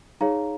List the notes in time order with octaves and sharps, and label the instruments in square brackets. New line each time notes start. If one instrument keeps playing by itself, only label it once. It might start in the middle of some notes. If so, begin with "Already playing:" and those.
[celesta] D#4 G#4 C#5 F5 A#5